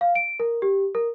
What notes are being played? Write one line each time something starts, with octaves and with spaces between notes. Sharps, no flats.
F5
D7
A#4
G4
A#4